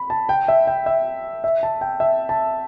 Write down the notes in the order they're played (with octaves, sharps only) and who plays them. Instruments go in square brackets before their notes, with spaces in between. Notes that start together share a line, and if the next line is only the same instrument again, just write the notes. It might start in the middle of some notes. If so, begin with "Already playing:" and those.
Already playing: [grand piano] B5
A5
G5
E5
G5
E5
E5
A5
G5
E5
A5